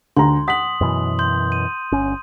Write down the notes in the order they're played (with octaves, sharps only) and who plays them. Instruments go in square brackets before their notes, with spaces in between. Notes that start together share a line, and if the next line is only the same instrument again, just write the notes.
[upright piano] D2 A#5 [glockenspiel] C6
[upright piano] F#5 B6 [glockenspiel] D#6 F#7
[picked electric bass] F#2 B2 E3
[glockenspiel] C6 G6
D#7
[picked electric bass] G1 C#4